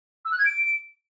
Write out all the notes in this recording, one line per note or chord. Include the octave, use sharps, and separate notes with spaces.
E6
F#6
G#6
D7